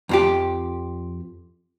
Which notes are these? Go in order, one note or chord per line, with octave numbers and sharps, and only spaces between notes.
F2 F3 G4